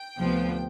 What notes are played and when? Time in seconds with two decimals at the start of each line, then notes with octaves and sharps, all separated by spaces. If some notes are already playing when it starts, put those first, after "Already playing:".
Already playing: G5
0.18 D2 C3 F3 B3